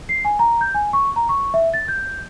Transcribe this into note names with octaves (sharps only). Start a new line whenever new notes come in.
C7
G#5
A#5
G6
G#5
C#6
A#5
C#6
E5
A6
G6